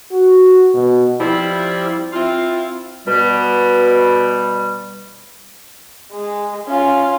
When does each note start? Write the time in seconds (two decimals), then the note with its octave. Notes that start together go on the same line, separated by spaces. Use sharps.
0.12 F#4
0.74 B2
1.19 F3 G3 C4 E4
2.12 C4 E4 F4
3.08 B2 G3
6.12 G#3
6.67 C#4 F4